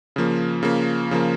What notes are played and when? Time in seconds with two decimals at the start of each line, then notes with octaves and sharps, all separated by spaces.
0.16 C#3 F3 A#3
0.63 C#3 F3 A#3
1.11 C#3 F3 A#3